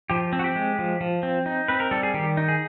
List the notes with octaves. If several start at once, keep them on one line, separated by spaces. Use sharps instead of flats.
F3 G4
C4
F#4
G4
G#3
F3
F3
C4
D#4
C4 B4
A#4
G3 A4
G#4
D#3 G4
D#4
G#4